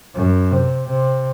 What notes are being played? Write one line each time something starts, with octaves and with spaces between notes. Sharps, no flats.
F#2
C3
C3